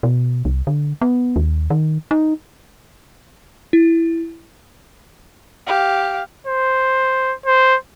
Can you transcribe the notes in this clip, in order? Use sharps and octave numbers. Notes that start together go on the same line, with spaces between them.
B2
C2
D3
B3
D#2
D#3
D#4
E4
G4 F5
C5
C5